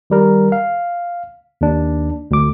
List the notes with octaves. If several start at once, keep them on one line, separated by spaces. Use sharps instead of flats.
D#3 G3 A#4
F5
D#2 D4
D2 D6